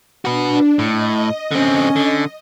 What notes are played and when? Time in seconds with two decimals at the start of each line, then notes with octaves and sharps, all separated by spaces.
0.25 D4 F#4 B4
0.79 A2 D#5
1.51 D3 C4 C#4
1.96 D3